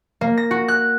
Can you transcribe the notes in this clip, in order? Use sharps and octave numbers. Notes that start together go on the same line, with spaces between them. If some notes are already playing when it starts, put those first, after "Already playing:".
A#3
A#6
F#4
F#6